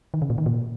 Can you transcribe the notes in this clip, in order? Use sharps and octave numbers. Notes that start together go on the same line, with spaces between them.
D#3
C#3
A#2
D#3
A#2